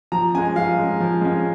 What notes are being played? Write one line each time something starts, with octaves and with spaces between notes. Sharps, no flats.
F3 A#5
G#3 C#4 G#5
F3 F5
G#3 C#4
F3
G#3 C#4